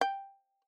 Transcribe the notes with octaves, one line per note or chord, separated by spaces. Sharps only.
G5